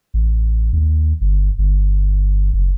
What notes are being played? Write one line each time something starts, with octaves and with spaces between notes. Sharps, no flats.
A1
D#2
G1
G1
F#1